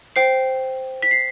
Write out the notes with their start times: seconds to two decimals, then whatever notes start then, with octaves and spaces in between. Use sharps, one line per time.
0.16 C5 G5 C7
1.03 B6
1.11 C7